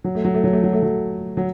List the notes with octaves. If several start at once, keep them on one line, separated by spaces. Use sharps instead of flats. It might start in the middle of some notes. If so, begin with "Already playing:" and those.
F#3
A3
F#3
A3
F#3
A3
F#3
A3
F#3
F#3